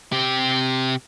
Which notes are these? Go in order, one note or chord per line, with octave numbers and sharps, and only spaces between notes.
C3 G4